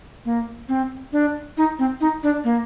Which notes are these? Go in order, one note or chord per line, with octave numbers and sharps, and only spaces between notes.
A#3
C4
D4
D#4
C4
D#4
D4
A#3